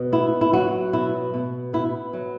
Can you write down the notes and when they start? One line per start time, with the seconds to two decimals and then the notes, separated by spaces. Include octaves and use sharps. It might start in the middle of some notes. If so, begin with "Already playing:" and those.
Already playing: B2
0.12 B3 E4
0.41 E4
0.53 F#3 F#4
0.93 B2 E4
1.34 B2
1.73 B3 E4
2.13 F#3